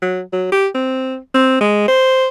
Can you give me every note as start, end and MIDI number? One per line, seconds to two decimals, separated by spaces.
0.02 0.21 54
0.33 0.51 54
0.52 0.67 67
0.74 1.17 60
1.34 1.58 60
1.61 1.86 56
1.88 2.27 72